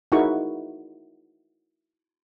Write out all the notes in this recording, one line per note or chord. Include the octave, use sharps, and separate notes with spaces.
D#4 E4 F#4 G#4 A#4 C#6